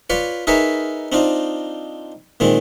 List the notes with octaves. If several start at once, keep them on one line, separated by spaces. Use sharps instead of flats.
F4 B4 C#5 D5
D#4 G#4 A#4 B4 C#5 E5
C4 D4 D#4 F4
A#2 D#3 G#3 C4